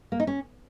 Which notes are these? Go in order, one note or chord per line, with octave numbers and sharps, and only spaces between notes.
A#3
D#4
C#4